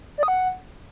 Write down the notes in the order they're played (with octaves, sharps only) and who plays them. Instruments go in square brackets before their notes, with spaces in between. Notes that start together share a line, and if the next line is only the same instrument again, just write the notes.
[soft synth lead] D5
D#6
F#5